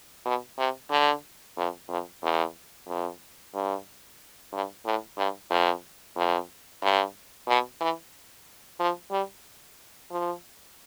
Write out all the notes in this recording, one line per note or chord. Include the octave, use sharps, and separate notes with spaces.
B2
C3
D3
F2
F2
E2
F2
G2
G2
A2
G2
F2
F2
G2
B2
E3
F3
G3
F3